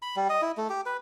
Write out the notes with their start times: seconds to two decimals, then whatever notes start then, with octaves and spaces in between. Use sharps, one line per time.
0.02 B5
0.16 G3
0.29 D#5
0.42 E4
0.57 A3
0.70 G4
0.86 B4